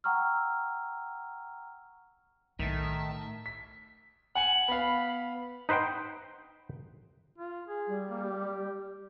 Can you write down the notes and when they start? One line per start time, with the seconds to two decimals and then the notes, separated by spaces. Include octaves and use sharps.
0.04 F#5 G5 A#5 C#6 E6 F6
2.59 B1 A2 D#3 E5 A5 A6
3.46 B6
4.35 F#5 G#5 C#7 F#7
4.68 B3 F5 B5
5.69 D#4 B4 C5 F#5 G5
7.38 F4
7.68 G#4
7.88 G3
8.09 A#3
8.24 G4